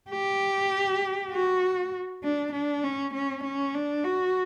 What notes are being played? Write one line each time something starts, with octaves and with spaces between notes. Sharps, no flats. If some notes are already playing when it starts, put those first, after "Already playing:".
G4
F#4
D4
D4
C#4
C#4
C#4
D4
F#4